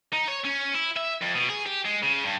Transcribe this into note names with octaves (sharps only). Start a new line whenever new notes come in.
D#4
C#5
C#4
E4
E5
F2
B2
G#4
G4
G#3
C#3
G2